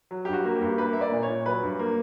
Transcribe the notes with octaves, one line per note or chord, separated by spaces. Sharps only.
F#3
G2 G4
F#4
A#3
G4
G2
A#3 B4
A#3 E5
D5
A#2
C#5
A#2
F#3 B4
G2
A#3